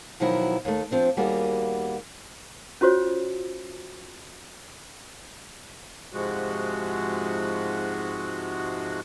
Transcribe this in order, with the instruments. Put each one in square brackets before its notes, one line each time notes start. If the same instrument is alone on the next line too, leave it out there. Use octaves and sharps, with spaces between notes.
[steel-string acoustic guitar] B2 D#3 F3 F#3 E4 F#4
D#2 A3
F3 C4 D4
D#2 G3 A#3 B3 F#4 G#4
[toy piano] C#4 F4 F#4 C5 C#5
[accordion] G#2 C3 F3 G#3 F#4